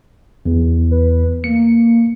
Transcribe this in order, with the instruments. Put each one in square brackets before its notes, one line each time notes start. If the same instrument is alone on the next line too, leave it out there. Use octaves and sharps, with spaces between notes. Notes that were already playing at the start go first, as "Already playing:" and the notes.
[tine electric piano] E2
[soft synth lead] B4
[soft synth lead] A#3 [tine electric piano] C#7